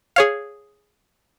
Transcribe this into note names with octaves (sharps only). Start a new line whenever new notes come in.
G#4 C#5 F5